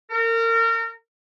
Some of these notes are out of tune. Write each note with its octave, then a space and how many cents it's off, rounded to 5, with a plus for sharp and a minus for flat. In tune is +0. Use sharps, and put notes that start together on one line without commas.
A#4 -30